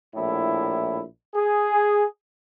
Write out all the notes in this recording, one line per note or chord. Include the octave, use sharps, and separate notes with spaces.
A#1 A2 E4
G#4